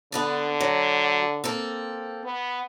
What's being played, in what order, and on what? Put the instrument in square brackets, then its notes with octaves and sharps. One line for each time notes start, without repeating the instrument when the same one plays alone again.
[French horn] D3 [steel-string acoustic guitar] B3 D4 A4
[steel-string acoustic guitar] F#3
A#3 C4 A4
[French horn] B3